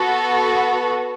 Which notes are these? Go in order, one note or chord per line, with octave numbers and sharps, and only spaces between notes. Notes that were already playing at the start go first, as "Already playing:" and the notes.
Already playing: B3 F#4 A4